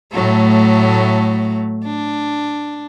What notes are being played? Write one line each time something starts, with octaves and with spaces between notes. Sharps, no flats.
A2 F#3 A3
D4